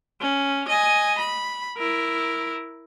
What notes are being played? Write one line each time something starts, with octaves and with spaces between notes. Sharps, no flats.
C#4
D#5 G#5
B5
E4 A#4